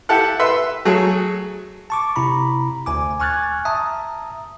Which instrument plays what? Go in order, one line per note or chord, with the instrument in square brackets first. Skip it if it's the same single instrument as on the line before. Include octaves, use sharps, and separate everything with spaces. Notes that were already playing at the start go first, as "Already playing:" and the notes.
[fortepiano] E4 G4 A4 F#5
B4 E5 C6
F#3 A3 G#4
[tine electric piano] A5 C#6 D6
C3 E4 A#5 B5
D2 G#5 D6
G#5 C#6 F6 F#6 G#6 A6
E5 A5 A#5 D#6